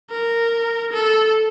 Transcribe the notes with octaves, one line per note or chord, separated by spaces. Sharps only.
A#4
A4